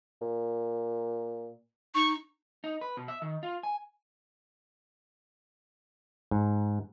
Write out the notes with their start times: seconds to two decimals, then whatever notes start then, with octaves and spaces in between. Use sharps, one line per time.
0.21 A#2
1.95 D#4 C#6
2.64 D#4
2.81 B4
2.97 B2
3.08 E5
3.22 D#3
3.43 F4
3.63 G#5
6.31 G#2